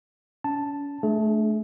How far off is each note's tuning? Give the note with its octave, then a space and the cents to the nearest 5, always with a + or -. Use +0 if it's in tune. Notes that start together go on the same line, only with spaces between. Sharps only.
C#4 +40 A5 +0
A3 -20 D4 +0 G#4 +30